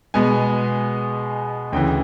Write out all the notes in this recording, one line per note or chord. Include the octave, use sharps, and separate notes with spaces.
B2 G#3 B3 G#5
D2 C#3 E3 G5